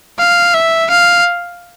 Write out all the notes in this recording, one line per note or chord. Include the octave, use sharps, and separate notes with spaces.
F5
E5
F5